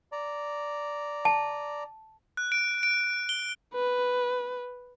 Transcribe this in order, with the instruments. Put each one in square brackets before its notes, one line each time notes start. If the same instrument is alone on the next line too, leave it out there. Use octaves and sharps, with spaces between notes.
[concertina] D5 A#5
[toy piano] A5
[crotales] F#6
D7
D7
G7
[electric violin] B4